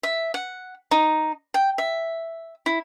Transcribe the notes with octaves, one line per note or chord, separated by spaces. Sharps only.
E5
F#5
D#4
G5
E5
E4